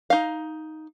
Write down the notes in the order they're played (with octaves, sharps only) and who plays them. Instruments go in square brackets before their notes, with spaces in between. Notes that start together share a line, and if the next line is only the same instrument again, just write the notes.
[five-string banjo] D#4 F5